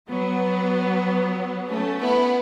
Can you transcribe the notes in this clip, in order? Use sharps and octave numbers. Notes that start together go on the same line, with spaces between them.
F#3 B3
A3 C#4
B3 E4